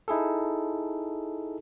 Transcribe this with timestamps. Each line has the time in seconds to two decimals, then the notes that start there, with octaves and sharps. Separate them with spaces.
0.08 D#4 E4 G#4 A4